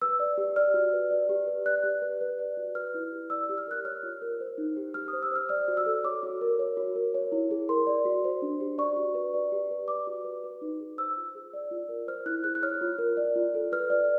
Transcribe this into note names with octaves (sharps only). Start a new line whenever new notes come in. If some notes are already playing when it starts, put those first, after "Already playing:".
B4 E6
D5
G4
D5 F6
F#4
B4
D5
G4
B4
D5 F#6
G4
B4
B4
D5
F#4
B4 F6
E4
G4
D5 E6
E6
G4
F6
A#4 F#6
C#5 F6
F4
A#4
C5
D#4
G4
G4 F6
D#6
C5
E6
C5 F6
D5 F6
F#4
E6
A4
C#5 D6
F#4
A#4
C#5
F#4
A#4
C#5
E4
G#4
A#4 C6
D5
F#4
C5
D4
G4
D5 C#6
F#4
B4
D5
G4
B4
D5 D6
F#4
B4
B4
D#4
G#4
C5 E6
F4
G#4
D5
F4
A#4
C5 F6
E4 F#6
G#4 F#6
F#6
C#5 F6
F4
A#4
D5
F4
A4
B4 F6
D5